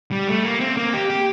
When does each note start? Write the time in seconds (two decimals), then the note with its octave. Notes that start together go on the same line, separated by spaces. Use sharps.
0.12 G3
0.28 A3
0.44 A#3
0.60 C4
0.77 A#3
0.93 G4
1.10 G4